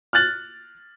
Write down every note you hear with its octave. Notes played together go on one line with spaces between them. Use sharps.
F6 F#6 A6 F#7